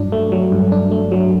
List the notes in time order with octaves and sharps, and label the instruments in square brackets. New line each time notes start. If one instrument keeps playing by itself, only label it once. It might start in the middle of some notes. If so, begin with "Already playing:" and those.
Already playing: [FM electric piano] G2 F#3 D4
A3
F#3
G2
D4
A3
F#3